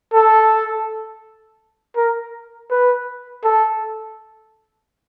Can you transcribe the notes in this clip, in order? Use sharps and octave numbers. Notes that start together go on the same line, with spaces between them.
A4
A#4
B4
A4